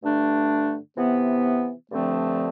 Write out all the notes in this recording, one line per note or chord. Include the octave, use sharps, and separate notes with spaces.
G2 D3 A3 D4
C3 E3 B3
G2 D3 F3 A3 C4